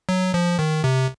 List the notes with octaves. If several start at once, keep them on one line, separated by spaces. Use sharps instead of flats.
F#3
F3
D#3
C3